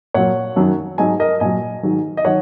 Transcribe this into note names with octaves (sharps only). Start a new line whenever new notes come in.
A#2 F#3 C#5 F#5
F#2 D#3 F#3
G#2 F#3 D#5 G#5
A#4 D#5
A#2 F#3 D#5 G#5
G#2 D#3 F#3
D#5
D#3 F#3 C#5 F#5